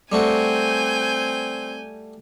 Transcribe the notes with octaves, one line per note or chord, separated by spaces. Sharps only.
G3 A3 C4 F#4 G#5 G6